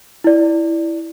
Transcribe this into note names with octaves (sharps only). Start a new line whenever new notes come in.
E4 D5